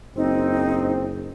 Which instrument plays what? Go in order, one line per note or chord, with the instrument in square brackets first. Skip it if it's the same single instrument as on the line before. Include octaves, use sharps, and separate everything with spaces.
[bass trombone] F#1 [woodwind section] C4 [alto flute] D#4